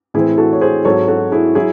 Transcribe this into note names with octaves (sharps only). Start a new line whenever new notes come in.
A2 E3 C4 E4 G#4
F#4 A4
C#5
G#4 C5
G#2 F#3 C4 A4 C#5
F#4 A4
E4 G#4
F#3 E4 G#4